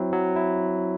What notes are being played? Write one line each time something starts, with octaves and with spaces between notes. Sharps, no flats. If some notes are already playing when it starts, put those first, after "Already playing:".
Already playing: F#3 C4 E4
F#3
E4